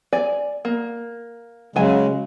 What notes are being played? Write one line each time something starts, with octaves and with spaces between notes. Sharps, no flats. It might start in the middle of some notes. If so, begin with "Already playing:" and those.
D5 G#5
A#3
C#3 F#3 G#3 G#5